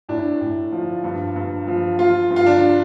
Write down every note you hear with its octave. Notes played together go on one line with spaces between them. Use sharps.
A2 D4
A2
F3
G2
G2
F3
F3 F4
G2
F4
D4